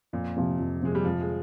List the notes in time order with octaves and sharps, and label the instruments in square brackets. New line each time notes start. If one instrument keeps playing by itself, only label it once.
[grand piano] F2 [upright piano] A#2
[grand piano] C3 F3 C4
F2
[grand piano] C3 F3 C4 [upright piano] G#3
[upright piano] G3
[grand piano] F2 [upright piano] F3
[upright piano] G#3